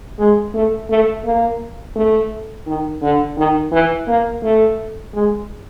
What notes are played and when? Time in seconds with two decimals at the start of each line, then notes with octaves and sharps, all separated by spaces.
0.19 G#3
0.55 A3
0.90 A3
1.25 A#3
1.96 A3
2.67 D#3
3.02 D3
3.37 D#3
3.72 E3
4.08 A#3
4.43 A3
5.14 G#3